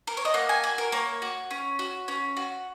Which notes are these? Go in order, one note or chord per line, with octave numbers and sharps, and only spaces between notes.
A#4
C#5
D#5
A#3 F#5
G#5
F#4 G#5
A#4
A#3 C#5
F#4
C#4
F#4
C#4
F#4